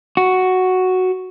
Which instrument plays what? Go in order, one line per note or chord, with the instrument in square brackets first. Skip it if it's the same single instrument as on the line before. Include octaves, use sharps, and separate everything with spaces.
[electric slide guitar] F#4